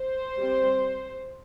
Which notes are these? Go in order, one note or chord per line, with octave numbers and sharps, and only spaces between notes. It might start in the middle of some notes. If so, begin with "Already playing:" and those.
Already playing: C5
G3 C4